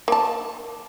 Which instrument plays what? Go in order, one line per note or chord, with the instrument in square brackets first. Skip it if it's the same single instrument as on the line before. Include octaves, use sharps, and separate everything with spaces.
[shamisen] A#3 A5